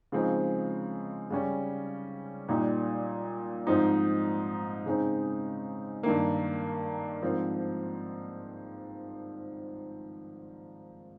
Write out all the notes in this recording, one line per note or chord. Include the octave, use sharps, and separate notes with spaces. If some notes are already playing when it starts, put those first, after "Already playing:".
C#3 F3 G#3 C4 D#4
C#3 G3 C#4
A#2 G3 A#3 D#4
G#2 F3 C4 D#4
C#3 G#3 C4 D#4
G2 D#3 A#3
G#2 F3 C4